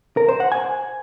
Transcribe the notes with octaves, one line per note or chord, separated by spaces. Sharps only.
A#4
C5
F#5
G#5